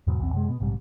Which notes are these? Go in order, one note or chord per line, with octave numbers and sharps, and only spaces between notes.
E2 G#2 B2 F#3
B1 E2 C4
F#2 C3 G#3
B2 B3
A#1 G#2 C3 G3